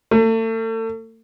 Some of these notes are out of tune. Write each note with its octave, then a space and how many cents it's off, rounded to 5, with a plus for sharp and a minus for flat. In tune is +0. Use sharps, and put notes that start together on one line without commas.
A3 +40